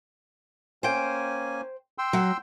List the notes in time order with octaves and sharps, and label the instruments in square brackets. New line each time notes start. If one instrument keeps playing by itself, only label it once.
[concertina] A#3 C#4 G#5 [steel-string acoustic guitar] C5 G5
[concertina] G5 C6 E6
[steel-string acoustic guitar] F#3